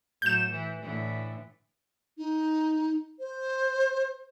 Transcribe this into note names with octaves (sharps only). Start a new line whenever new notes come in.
A2 F#3 G6 E7
E3
A2 D3 E3
D#4
C5